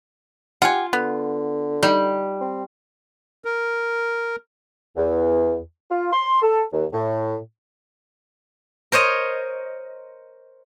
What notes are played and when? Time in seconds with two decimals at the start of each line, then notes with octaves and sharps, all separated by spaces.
0.62 F4 G4 F#5 G#5
0.93 D3 B3
1.83 G3 D#4
2.41 C4
3.45 A#4
4.96 E2
5.90 F4
6.12 C6
6.42 A4
6.72 D#2
6.93 A2
8.92 A#4 C5 C#5 D#5